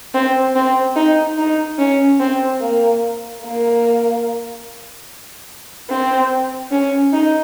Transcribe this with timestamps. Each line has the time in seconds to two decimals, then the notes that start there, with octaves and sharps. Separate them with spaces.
0.14 C4
0.56 C4
0.96 D#4
1.38 D#4
1.78 C#4
2.20 C4
2.60 A#3
3.42 A#3
5.89 C4
6.71 C#4
7.13 D#4